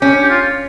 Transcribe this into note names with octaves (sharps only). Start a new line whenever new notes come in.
C#4 G4
G4
F4